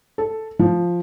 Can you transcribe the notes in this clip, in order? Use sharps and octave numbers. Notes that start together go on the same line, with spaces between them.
A4
F3